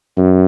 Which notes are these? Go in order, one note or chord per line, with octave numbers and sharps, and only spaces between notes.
F#2